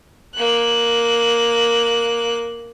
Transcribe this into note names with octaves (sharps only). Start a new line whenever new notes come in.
A#3 F#6